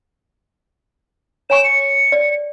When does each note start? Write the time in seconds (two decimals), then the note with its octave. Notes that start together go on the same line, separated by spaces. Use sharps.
1.50 C#5 G#5 C#6 E7
1.64 C#7
2.12 D5